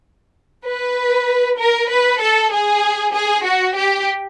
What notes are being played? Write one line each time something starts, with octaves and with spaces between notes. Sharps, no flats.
B4
A#4
B4
A4
G#4
G#4
F#4
G4